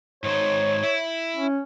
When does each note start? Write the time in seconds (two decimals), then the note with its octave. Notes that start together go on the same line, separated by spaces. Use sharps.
0.24 G#2 D#3 C5 C#5
0.83 E4
1.37 C#4